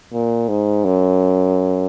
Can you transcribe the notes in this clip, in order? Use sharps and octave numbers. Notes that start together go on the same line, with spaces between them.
A#2
G#2
F#2